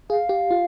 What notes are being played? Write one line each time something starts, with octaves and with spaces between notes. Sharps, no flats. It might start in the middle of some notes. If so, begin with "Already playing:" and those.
G#4 F5
G4
F4